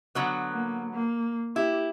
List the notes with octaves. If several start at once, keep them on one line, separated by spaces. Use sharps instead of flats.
D3 F#3 B3
A#3
A#3
E4 G4